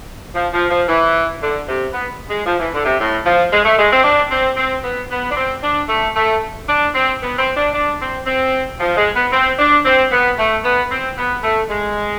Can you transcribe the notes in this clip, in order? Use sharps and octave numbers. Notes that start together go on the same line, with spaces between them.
F3
F3
F3
E3
D3
C3
B3
G#3
F3
E3
D3
C3
A2
F3
G#3
A3
G#3
C4
D4
C4
C4
B3
B3
D4
C4
D4
A3
A3
D4
C4
B3
C4
D4
D4
C4
C4
F3
G#3
B3
C4
D4
C4
B3
A3
B3
C4
B3
A3
G#3